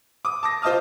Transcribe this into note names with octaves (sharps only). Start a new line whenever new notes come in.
D6 D#6
A5 D6 A#6
F4 C5 D#5 A5 D#6 F6